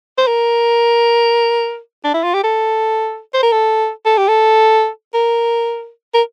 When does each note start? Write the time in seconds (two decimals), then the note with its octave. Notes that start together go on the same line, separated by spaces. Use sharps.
0.18 C5
0.27 A#4
2.04 D4
2.14 E4
2.24 F4
2.34 G4
2.44 A4
3.34 C5
3.43 A#4
3.52 A4
4.05 A4
4.18 G4
4.28 A4
5.14 A#4
6.14 A#4